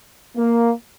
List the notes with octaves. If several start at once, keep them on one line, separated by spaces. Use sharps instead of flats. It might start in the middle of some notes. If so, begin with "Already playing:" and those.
A#3